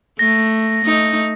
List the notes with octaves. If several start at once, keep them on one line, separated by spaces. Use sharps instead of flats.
A3 A#6
A3 D#4